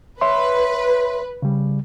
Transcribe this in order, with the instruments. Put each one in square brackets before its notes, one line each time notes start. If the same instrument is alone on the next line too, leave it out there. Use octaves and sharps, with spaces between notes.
[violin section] B4 [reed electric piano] C#5 E5 C6
[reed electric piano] C#3 G3